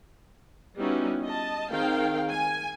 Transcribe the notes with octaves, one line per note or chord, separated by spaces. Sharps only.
G3 B3 C#4 D#4 E4 F#4
D#5 A5
D#3 C4 G#4 A#4 F5 G5
G#5